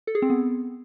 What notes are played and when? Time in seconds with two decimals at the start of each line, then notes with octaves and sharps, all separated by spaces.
0.07 A4
0.15 G#4
0.22 C4
0.30 B3